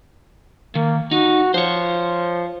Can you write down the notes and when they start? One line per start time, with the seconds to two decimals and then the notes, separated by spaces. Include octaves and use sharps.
0.75 D#3 A#3
1.11 D#4 F#4
1.54 F3 C5 C#5